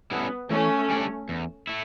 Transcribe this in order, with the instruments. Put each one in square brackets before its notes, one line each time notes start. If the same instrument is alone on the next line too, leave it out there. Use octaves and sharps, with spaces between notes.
[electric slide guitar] G3 C#4 E4 A4 [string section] B3
[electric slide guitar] E3 [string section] A3 C#4
[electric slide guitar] G3 D4 A4 D5
E2
A3 E4